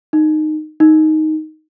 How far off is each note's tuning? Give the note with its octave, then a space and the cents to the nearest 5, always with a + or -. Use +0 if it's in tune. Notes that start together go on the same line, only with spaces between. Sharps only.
D#4 -15
D#4 +5